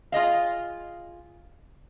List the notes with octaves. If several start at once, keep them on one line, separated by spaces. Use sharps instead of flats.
F4 G#4 D#5 F5